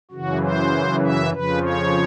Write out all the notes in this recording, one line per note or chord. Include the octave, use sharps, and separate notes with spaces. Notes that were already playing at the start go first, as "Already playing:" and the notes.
F#2 C#3 E3 F#4
C5
E5
F2 C#3 F3 B4
C#5